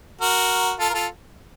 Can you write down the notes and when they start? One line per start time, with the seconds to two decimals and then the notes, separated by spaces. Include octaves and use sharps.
0.21 F#4 A#4
0.79 F4 A4
0.90 A#4
0.93 F4 A4